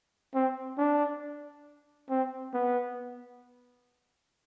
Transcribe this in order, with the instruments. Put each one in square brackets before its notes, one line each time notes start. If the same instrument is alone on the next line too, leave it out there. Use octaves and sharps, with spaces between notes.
[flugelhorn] C4
D4
C4
B3